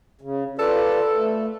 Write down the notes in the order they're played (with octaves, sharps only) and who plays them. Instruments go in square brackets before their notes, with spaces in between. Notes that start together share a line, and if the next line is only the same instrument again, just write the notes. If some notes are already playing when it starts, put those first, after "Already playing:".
[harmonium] C#3
[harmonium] F4 B4 D5 [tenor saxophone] A4
[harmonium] A3